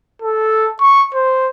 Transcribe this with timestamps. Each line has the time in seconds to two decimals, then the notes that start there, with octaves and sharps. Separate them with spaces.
0.22 A4
0.80 C#6
1.14 C5